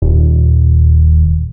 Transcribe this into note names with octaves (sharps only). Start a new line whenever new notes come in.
D#1